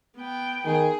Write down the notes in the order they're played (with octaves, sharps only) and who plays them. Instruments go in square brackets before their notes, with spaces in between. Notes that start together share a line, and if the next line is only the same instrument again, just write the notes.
[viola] B3 G5
[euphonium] D#3 [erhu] G#4